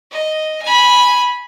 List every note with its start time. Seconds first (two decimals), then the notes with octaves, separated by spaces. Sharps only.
0.11 D#5
0.62 G#5 B5